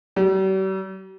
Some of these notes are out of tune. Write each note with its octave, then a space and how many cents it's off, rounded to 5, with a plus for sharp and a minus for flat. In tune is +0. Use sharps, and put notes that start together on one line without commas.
G3 -45